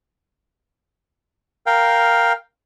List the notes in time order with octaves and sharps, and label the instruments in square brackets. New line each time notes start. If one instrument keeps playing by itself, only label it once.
[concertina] A#4 F5 G5